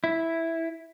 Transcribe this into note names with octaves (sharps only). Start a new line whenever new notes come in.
E4